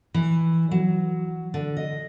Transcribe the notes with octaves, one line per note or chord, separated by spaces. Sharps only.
E3
F#3
D3
D#5